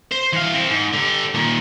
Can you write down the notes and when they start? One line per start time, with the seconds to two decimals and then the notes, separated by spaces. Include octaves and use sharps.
0.12 C5
0.33 E3 F5
0.54 C4 E4
0.69 G#2
0.94 D3 G4
1.35 A#2 D#3